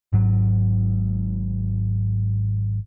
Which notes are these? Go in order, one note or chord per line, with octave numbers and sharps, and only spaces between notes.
G#1 G#2 F#3